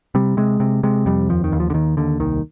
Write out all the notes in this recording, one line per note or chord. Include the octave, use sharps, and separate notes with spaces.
C3 G3
C3 G#3
C3
C3 G#3
F2 G3
D#2 F3
D#3
D#2
F3
D3
D#2 D#3
D#2 D3
C2 D#3